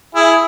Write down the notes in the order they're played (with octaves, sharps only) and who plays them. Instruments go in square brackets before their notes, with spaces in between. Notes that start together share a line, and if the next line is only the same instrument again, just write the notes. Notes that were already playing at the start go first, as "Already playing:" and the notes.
[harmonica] E4 G#4